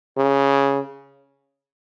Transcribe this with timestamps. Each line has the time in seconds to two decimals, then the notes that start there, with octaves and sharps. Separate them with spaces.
0.17 C#3